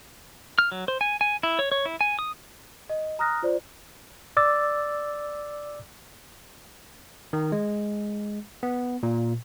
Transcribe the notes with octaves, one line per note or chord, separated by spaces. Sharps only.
F6
F#3
C5
G#5
G#5
E4
C#5
C#5
E4
G#5
D#6
D#5
A#5 D#6 F6 F#6 A#6
F4 C5 D5
D5 D6 E6 A6
D#3
G#3
B3
A#2